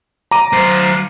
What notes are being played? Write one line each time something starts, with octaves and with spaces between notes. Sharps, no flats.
A#5 D6 D#7
F#3 C5